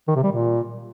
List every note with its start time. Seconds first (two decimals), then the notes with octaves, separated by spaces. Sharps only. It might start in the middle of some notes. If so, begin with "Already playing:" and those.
0.08 D#3
0.15 C3
0.23 G3
0.31 A#2